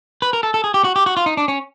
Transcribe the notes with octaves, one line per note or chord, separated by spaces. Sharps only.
B4
A#4
A4
A4
G#4
G4
F#4
G4
F#4
F4
D#4
D4
C#4